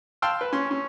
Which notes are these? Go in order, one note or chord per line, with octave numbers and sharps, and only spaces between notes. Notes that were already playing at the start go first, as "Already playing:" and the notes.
F5 G5 A5 C6 E6 F6
B4
C#4 C6
C#4